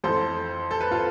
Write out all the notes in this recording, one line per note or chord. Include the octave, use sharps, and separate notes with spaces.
F2 E3 A4 C5
A4
B4
F4 A4